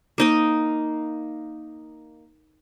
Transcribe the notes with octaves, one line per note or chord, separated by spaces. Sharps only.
A#3 D#4 D#5